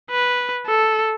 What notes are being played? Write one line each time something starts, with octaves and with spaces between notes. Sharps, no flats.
B4
A4